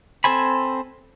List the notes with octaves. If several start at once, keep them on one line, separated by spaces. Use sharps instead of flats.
C4 A4 C5 G#5 B5